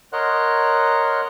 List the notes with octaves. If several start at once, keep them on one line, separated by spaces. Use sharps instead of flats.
A#4 C#5 D#5 F#5 C6 F#6